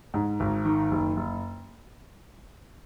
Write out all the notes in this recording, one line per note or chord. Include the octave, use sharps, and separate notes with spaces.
G#2
G#1
D#3
F#1
F#1